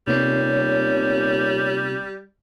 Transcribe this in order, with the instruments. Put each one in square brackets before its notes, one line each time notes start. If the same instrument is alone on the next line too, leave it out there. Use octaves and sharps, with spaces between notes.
[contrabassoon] D#1 [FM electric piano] C3 B3 C4 [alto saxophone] G3 [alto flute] C#5